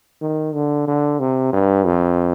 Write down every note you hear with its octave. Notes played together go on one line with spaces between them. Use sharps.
D#3
D3
D3
C3
G2
F2